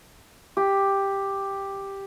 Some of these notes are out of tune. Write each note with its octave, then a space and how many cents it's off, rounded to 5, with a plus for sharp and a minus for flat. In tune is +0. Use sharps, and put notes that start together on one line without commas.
G4 +5